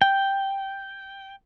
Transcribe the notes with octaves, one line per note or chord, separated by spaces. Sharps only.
G5